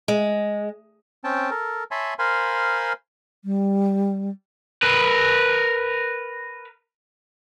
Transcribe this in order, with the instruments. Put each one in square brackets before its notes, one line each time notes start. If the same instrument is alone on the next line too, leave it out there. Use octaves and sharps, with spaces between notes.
[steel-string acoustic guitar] G#3
[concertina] C4 C#4 G5 A5
A4 A#4
C#5 E5 G#5 A5 B5 C6
A#4 C5 F5 G#5 B5 C6
[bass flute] G3
[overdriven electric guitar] A#4 B4